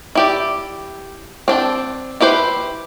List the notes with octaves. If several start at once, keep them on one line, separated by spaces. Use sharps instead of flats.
E4 G4 D5
C4 D4 G5 A5
E4 G4 B4 C5